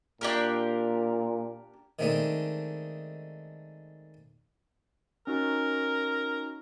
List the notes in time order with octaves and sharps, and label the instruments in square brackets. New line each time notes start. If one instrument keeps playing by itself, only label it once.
[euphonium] A#2 [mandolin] D4 G4 A#4
[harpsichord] D#3 G#3 A3 C4 D4 D#4
[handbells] C#4 D#4 F#4 [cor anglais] A#4